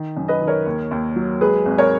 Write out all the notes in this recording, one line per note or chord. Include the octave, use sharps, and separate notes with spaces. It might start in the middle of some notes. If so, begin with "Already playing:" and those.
Already playing: D#3
F#2
B4 D#5
D#3
A#4 C#5
D#2
D#2
F#3
G#3 G#4 B4
G#1
A#4 C#5